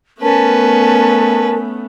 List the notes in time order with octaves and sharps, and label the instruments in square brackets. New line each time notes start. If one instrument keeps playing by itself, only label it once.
[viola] A3 B3 [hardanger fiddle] C#4 B4 [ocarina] A#4 [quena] A5